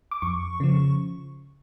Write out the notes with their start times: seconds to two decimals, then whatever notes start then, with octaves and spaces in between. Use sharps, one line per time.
0.11 D6
0.22 F2 C#6
0.60 C#3 F3